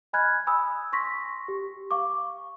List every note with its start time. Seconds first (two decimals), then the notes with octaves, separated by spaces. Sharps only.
0.13 D#5 G#5 B5 F6 F#6 G#6
0.47 G#5 B5 D#6 E6
0.92 C6 C#6 A#6 B6
1.48 G4
1.91 F5 C#6 D6